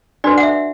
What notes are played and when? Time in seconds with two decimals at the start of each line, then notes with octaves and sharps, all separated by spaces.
0.24 D4 F#4 B4 D5
0.38 F#5
0.43 E5